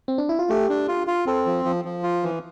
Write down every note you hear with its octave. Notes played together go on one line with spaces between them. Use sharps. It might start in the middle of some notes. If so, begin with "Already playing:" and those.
C4
D4
E4
F4
A3 G4
D4
F4
F4
C4 A4
F3
F3
F3
F4
E3